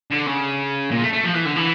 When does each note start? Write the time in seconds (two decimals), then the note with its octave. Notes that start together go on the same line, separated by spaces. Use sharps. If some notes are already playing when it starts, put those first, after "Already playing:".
0.10 D3
0.26 C#3
0.91 A#2
1.02 A3
1.13 A3
1.24 F3
1.35 E3
1.46 D3
1.56 E3